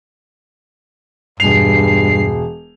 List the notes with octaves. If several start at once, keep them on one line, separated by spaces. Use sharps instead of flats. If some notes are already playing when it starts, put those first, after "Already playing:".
E1 G2 C7 F7